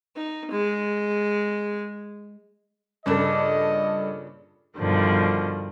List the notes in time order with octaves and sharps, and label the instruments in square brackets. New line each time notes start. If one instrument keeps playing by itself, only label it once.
[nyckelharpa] D#4
G#3
[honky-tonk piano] G2 A4 [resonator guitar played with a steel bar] A#2 C#3 D4 [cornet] D#5
[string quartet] G2 B2 D3 D#3 F3